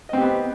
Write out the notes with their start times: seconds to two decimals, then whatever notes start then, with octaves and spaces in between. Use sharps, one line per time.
0.09 D#5
0.13 C4
0.17 G4
0.21 B3